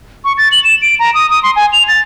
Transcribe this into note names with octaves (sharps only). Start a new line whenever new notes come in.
C#6
A6
F#7
E7
D7
A#5
D#6
D#6
C6
G#5
F7
A6